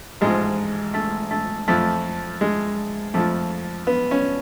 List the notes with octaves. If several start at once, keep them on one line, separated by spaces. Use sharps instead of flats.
A1 G#2 F3 G#3
A3
A3
F2 F3 A3
G#3
F2 F3 A3
B3
C#4